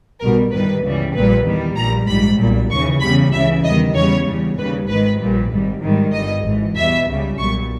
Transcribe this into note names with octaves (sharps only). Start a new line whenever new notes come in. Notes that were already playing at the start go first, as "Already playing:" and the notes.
B1 B2 G3 A#4
G1 G2 D#3 G3 B4
C#2 C#3 E3 G3
A#1 A#2 G3 B4
E2 D#3 G3
A#1 A#2 G3 A#5
A#1 G#2 G3 B5
B1 A#2 G3
D#2 C#3 E3 C#6
E2 C#3 E3 G3 B5
C#2 C#3 E3 E5
E2 D#3 G3 D#5
E2 C#3 G3 C#5
E2 C#3 G3
D#2 C#3 G3 B4
G#1 G#2 D#3 B4
A#1 A#2 G3
G#1 G#2 G3
G#1 G#2 D#3 G3
G1 G2 G3 D#5
G#1 G#2 E3
E2 B2 G3 E5
C#2 C#3 G3
B1 A#2 G3 C#6